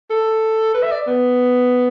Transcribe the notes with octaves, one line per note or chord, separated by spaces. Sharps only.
A4
B4
E5
D5
B3